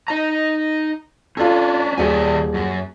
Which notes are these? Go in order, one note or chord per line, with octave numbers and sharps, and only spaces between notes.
D#4 A#5
C#4 D4 F4 A4
D#1 D#3 G#4 D5 G#5
F#2